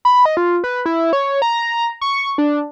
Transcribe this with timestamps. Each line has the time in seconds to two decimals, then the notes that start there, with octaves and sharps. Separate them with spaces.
0.05 B5
0.25 D#5
0.37 F4
0.64 B4
0.86 E4
1.13 C#5
1.42 A#5
2.01 C#6
2.38 D4